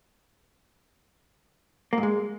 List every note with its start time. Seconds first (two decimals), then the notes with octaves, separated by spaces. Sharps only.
1.93 A#3
1.98 G#2
2.03 G#3